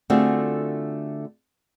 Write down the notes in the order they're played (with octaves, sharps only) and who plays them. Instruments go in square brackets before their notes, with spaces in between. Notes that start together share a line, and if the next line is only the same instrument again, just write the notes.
[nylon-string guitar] D3 A3 C4 F4 F#4 G#4